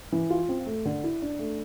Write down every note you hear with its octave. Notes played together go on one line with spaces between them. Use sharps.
E3
F4
C4
A3
D3
E4
D4
A3